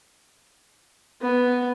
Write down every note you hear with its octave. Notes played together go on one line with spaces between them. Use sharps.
B3